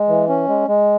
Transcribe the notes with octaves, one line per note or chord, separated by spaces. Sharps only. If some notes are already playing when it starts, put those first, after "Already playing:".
Already playing: G#3
E3
C#4
G#3
G#3